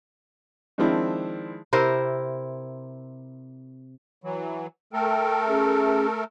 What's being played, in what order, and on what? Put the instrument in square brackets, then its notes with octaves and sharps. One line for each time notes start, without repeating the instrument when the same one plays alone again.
[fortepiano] D#3 F3 G#3 C4 D4 E4
[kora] C3 E4 A#4 C5
[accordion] E3 F#3
[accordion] A3 A4 A#4 [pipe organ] G5
[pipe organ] C#4 G#4